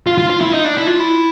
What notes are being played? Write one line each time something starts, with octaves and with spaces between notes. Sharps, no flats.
F4
F4
F4
E4
D#4
D4
E4
F4
E4